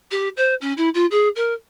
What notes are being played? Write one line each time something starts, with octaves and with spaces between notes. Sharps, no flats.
G4
C5
C#4
E4
F4
G#4
A#4